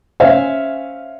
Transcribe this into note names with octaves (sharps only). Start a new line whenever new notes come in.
C#4 C5 E5 F5 G#5